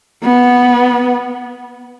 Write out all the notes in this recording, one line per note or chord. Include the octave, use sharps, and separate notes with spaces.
B3